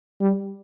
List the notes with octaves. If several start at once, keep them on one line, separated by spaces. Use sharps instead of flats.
G3